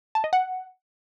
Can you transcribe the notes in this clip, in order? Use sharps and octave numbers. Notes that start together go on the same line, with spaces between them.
A5
D#5
F#5